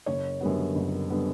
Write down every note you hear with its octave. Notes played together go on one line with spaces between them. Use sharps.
F#1 C#5
F#2 D3 G3 B3
F#1
D3 G3 B3